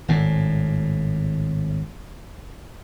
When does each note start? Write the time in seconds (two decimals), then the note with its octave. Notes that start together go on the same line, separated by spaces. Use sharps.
0.08 G#1 A2